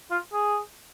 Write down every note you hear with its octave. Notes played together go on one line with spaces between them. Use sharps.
F4
G#4